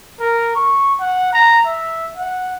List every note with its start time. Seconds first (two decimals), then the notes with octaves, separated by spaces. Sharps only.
0.20 A#4
0.56 C#6
1.01 F#5
1.33 A#5
1.66 E5
2.17 F#5